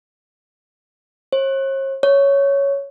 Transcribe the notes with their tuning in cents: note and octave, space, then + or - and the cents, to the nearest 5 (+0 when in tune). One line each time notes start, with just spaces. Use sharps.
C#5 -45
C#5 +5